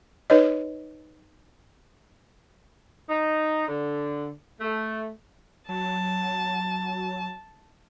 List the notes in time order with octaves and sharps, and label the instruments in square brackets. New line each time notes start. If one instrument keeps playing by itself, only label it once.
[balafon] D#4 B4 C#5 D#5
[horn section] D#4
D3
A3
[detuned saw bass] F#3 [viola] A5